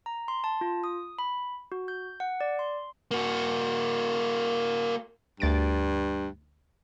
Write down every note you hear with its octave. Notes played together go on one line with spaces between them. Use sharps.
A#5
C6
A5
F4
D#6
B5
F#4
G6
F#5
D5
C6
A#3 F#4
D2 G2 A6 D7